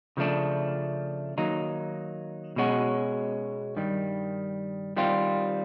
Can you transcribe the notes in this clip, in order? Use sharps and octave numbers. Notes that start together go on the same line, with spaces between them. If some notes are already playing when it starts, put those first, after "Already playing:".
C#3 F3 A3 D4
D#3 F#3 A#3 D#4
B2 G#3 C#4 F#4
G2 D#3 G3
D#3 G3 C4 F4